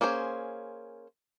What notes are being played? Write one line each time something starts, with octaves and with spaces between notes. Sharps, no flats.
A#3 C#4 G#4 C5